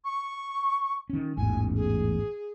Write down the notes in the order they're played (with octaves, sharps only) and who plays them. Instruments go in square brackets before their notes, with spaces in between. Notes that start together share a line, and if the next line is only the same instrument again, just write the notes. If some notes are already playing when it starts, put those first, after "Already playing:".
[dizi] C#6
[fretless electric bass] D#3 C#4
[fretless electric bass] A1 E2 G#2 [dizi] G#5
[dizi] G#4